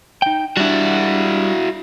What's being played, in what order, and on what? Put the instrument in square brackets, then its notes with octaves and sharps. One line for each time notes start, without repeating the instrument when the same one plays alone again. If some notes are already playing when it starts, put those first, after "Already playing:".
[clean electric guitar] D#4 G5
[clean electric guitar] G3 D4 [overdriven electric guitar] E4 F#4